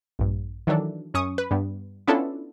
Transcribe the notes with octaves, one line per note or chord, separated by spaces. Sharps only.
A#1 G2
D#3 E3 F#3 D4 A4
F#2 C#4 C#6 D#6
B4
G2 G3 B3
B3 C#4 D4 E4 F4 A4